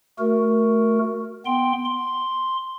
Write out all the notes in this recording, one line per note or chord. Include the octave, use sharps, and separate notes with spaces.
A3 F#4 A#4
B3 G5 C6
C6